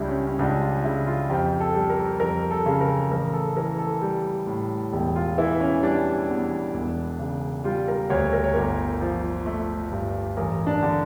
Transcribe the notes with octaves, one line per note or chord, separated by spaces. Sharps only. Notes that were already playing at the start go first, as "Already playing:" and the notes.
Already playing: C#2 G3 D4 E4
C#4
C#4
C#2 D4
F4
C#3 E4
F4
F2 G4
A4
G3
A#4
F2 A#4
A4
C#3
A#4
A1 A#4
A4
E3 A#4
A4
G3
A2
E1 G4
F4
E3 E4
C#4
G3 D4
E2
E1
C#3
G3 F4
A#4
D2 C#5
A#4
C#5
G1 A#4
F3
A3
G2
A1 A#4
D4
D3